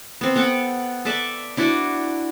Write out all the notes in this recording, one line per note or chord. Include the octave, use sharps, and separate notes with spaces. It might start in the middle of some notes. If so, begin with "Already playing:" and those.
B3 C4
B3 A4 F#5 G5
A4 B4 D5 E5
D4 E4 F#4 D5